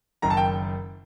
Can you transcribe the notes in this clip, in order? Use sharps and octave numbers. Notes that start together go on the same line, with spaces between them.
F#1 F#2 D#3 A#5
A5
G5